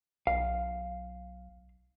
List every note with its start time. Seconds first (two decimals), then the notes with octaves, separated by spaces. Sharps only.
0.27 B1 F5